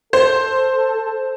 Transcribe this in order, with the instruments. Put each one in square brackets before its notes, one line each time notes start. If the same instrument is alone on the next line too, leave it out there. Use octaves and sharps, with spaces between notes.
[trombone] A4 [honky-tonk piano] C5